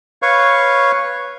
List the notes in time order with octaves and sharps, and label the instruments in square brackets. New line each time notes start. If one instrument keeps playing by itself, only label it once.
[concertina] B4 C#5 F5 C#6